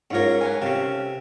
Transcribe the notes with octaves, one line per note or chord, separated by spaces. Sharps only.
G#2 C#4 F4 A#4 C#5
B4 C#5 G#5
C3 C#4 A4 F5